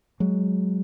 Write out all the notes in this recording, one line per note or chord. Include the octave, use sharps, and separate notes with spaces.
F#3 G#3